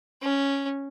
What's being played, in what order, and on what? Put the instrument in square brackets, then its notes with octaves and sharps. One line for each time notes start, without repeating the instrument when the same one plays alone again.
[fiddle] C#4